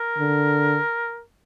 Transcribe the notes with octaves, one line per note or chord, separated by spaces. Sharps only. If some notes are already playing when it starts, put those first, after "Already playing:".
Already playing: A#4
D3